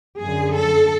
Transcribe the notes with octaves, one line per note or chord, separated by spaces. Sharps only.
F#2 D3 G#4
A4